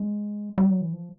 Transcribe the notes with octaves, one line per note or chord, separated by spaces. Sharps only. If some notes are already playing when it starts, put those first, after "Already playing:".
Already playing: G#3
G3
F#3
E3
F3